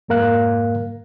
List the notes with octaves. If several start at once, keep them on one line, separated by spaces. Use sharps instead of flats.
F2 G#2 A#3 A#4 F5 F#6